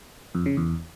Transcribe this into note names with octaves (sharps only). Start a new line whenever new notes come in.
F2
C#3
E2